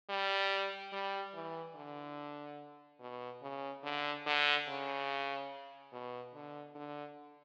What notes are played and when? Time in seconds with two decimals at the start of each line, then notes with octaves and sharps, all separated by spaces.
0.09 G3
0.92 G3
1.34 E3
1.75 D3
3.00 B2
3.42 C#3
3.83 D3
4.26 D3
4.68 C#3
5.93 B2
6.34 D3
6.75 D3